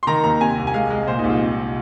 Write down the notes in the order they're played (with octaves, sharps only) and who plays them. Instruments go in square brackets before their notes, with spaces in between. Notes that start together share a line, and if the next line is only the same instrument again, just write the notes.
[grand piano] C6
D#3 A#5
D#2 A#5
C3 G#5
C2
G#5
G#3 F5
G#3
A#2 C5
D#4
C2
F4
C3